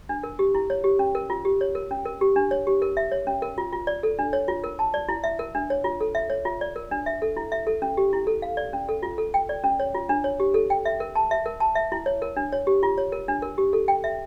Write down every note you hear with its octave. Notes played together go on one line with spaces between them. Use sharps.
D4
A#4
G4
E4
C#5
G4
C#4
A#4
F4
G4
C#5
A#4
C#4
A#4
G4
D4
C#5
G4
A#4
E5
C#5
C#4
A#4
F4
F4
D5
A4
D4
C#5
F4
A#4
A5
D5
E4
E5
A#4
D4
C#5
F4
A4
E5
C#5
F4
D5
A#4
D4
E5
A4
E4
E5
A4
C#4
G4
E4
A4
F5
D5
C#4
A4
F4
A4
G5
D5
C#4
C#5
F4
D4
C#5
G4
A4
G5
E5
A#4
A5
E5
A#4
A5
E5
E4
C#5
A#4
D4
C#5
G4
F4
C#5
A#4
D4
A#4
G4
A4
G5
E5